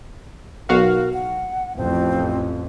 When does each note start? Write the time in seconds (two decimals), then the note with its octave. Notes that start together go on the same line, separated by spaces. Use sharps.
0.69 B1 F#4 A#4 F5
1.13 F#5
1.76 A1 F2 C4